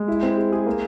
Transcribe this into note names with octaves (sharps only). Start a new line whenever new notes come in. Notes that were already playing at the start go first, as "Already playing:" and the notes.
Already playing: G#3
E4
C4
G#4
G#4
A#3